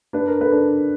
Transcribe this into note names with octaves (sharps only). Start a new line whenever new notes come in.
D4 B4
A#4
A4 B4
D4